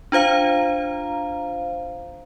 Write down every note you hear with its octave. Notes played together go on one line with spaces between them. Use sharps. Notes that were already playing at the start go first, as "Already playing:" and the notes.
D4 F4 C5 F5 A#5